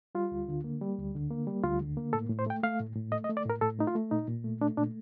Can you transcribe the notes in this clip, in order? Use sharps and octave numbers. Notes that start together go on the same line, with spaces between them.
G3 F4
D2
D3
A#3
G3
D2
D3
A#3
G3
D2 F4
D3
A#3
A2 A4
A2
C5
A3 G5
A3 F5
A2
A2
A3 D#5
D#5
A3
D5
A2 A#4
A2 A4
A3 D#4
F4
A3
A#2 D#4
A#2
A3
A3 D4
A#2 D4